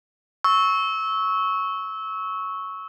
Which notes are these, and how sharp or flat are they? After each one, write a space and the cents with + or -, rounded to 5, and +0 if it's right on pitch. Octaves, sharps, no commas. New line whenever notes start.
C#6 +0 E6 -20